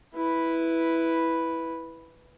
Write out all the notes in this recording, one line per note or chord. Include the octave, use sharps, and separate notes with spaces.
E4 B4